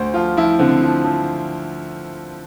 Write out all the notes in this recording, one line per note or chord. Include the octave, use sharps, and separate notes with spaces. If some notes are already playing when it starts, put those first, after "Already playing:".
Already playing: D2 C5
F3 F4
F3 E4
D3 C4
F3
F3